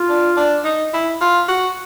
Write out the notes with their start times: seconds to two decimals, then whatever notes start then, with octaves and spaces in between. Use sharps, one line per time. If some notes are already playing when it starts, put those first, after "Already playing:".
Already playing: F4
0.09 D4
0.37 D4
0.64 D#4
0.93 E4
1.21 F4
1.48 F#4